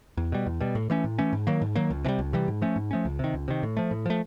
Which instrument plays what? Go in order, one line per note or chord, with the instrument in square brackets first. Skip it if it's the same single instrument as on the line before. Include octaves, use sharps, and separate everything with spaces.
[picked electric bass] E2
B2 G3
E2
B2 G3
A2
E3 A3 C#4
A2
E3 A3 C#4
G#2
D#3 F#3 A#3
G#2
D#3 F#3 A#3
C#2
C3 E3
G3
C#2
C3 E3 G3
G#2
F3 A3 C#4
G#2
F3 A3 C#4
C#2
C3 D#3
C#2
C3 D#3
A2
F3 A3
A2
F3 A3